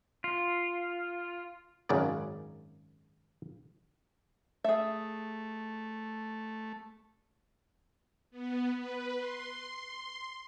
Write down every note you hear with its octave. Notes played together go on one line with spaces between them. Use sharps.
F4
G#1 F#2 C#3 D5
A3 G#4 E5
B3
B4
C6